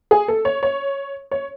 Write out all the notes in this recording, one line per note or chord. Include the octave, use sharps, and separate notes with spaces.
G#4
A4
C#5
C#5
C#5